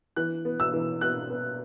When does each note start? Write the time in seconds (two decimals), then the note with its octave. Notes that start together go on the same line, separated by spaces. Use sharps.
0.16 E3 F#6
0.45 B3
0.60 E6
0.73 E3
1.01 B3 F#6
1.30 B3